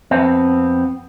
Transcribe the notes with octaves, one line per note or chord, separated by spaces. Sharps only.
F2 B3 C4